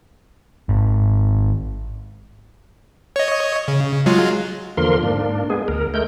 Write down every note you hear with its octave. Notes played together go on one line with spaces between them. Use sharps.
G#1
C#5 D#5
C#3
F#3 G#3 F4
E2 D3 F3 A#3 A#4 C6
G#2 A#3 D4
G#3 B3 G#4
D2 A#4
G#3 A3 A#4 G6